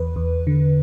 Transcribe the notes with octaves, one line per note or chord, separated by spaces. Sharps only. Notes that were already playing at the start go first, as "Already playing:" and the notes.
Already playing: E2 B4
E2
D3